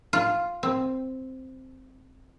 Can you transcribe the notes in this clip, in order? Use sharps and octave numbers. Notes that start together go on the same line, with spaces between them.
F4
C4